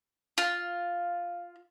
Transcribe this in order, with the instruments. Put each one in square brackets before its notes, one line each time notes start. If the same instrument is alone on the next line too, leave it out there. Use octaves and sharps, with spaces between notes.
[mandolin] F4